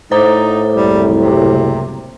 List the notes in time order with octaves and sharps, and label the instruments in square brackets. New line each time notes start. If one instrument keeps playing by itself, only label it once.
[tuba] A2 [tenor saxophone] D#4 [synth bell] C5 A#5 D6
[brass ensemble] F#1 C2 [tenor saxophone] G3
[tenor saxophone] C3